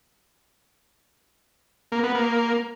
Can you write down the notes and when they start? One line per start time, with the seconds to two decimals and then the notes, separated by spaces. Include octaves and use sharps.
1.92 A#3
2.03 B3
2.15 A#3